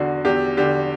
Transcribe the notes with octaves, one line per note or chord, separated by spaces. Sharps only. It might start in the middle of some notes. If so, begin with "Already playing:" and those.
Already playing: E2 D3 F#4
E2 G4
D3 G4